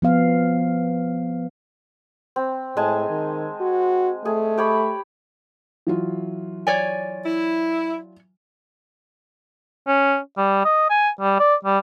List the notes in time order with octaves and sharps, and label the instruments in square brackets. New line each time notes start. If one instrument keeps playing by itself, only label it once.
[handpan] F3 B3 F5
[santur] C4
[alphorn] A2 [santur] G#3 G#5 A5
[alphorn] D#3
F#4
[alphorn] A3 [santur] G#4
[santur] G4 C#5 B5
[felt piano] E3 F#3 F4
[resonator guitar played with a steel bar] C#5 D5 G#5
[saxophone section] E4
[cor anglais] C#4
G3
D#5
G#5
G3
D5
G3